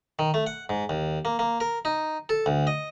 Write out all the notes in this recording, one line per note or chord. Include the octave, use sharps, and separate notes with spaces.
D#3
A3
F#5
G#2
D#2
A#3
A#3
A#4
D#4
A4
D2
D#5